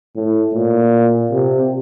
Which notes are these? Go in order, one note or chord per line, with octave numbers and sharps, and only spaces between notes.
A2
A#2
C3